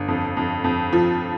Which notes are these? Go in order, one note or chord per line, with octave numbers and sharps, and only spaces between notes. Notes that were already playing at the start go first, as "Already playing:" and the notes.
Already playing: G1
F2
F2
F2
F3